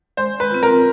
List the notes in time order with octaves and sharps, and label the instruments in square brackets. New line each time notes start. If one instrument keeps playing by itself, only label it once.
[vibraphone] G#3 [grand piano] C5
[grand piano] B4
[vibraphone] C4 F4
[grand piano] A#4